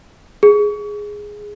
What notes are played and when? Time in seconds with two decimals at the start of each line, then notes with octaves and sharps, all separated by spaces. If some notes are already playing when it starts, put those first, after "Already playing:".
0.43 G#4